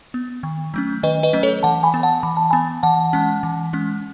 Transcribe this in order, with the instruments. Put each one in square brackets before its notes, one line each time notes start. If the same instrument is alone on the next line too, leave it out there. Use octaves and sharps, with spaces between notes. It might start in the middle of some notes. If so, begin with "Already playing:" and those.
[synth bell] B3
D#3
F#3 A3 C#4
D#3 B4 D#5
B4 D#5
F#3 A3 C#4
A4 C#5
E3 F#5 A5
G#5 B5
B3
F#5 A5
E3 B5
A5
B3 G#5 B5
E3 F#5 A5
G#3 C#4
E3
G#3 C#4